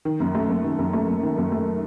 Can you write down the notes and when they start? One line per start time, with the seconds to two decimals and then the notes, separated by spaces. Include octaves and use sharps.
0.05 D#3
0.20 F#2
0.35 A3
0.49 F#2
0.64 D#3
0.79 F#2
0.93 A3
1.08 F#2
1.23 D#3
1.37 F#2
1.52 A3